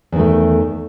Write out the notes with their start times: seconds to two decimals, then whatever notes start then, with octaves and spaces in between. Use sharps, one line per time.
0.12 E2
0.16 D#3
0.19 A3